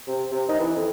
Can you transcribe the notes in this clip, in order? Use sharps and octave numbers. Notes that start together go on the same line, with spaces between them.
C3
C3
D#4
E3
F2